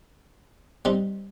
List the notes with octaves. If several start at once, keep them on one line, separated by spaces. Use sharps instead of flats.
G3 C4 D#4